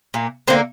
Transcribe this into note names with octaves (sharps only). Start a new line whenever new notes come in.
A#2 A#3
D3 A#3 C4